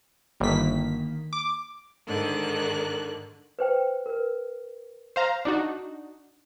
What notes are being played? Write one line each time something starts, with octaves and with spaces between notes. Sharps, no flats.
G1 D#3 A#3 B6
D6
G#2 D3 D#3 F#6
B4 C5 G5
A#4 B4
C5 F5 A#5
D4 D#4 F#4